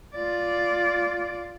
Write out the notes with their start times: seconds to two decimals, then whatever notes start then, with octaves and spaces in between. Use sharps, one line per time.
0.16 F4 D5